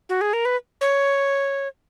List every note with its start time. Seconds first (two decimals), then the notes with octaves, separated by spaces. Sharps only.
0.09 F#4
0.21 G#4
0.33 A#4
0.45 B4
0.81 C#5